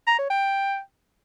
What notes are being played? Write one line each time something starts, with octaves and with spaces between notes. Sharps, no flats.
A#5
C#5
G5